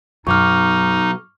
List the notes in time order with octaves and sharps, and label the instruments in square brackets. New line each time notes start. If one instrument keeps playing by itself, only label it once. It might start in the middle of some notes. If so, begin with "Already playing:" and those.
[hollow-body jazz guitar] B1 [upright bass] F#2 [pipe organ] D#4 [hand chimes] C#6 D6 F6